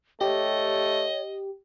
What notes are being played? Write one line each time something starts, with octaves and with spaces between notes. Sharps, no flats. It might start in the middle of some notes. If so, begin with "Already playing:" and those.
A3 G4 C#5 D#5